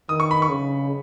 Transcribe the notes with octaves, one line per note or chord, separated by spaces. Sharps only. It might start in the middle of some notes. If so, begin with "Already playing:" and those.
D#3 D#6
C#6
B5
C#6
C#3